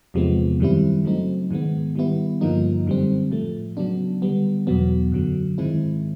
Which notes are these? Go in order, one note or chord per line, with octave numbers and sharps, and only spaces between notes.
E2 C3 F3 G#3 B3
F#2 D#3 G3 C4 E4
C#3 F#3 A3 C4 D#4
G#2 D#3 G#3 B3
D#3 G3 B3 E4
G2 D3 F3 A#3 D#4
F#2 D3 G3 C4
A2 F3 A3
C#3 F#3 B3 D4
D3 G3 B3
E2 B2 F#3 B3
F#2 D3 F#3
G#2 D#3 G#3 C4 E4